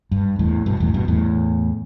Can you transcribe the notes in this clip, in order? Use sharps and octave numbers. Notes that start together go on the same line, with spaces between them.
G2
E2 A2
G2 B2
E2 A2
G2 B2
E2 A2